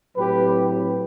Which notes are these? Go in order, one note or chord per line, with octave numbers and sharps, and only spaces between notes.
A2 F#3 C4 G4 B4